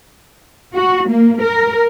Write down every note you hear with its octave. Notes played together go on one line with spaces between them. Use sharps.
F#4
A#3
A#4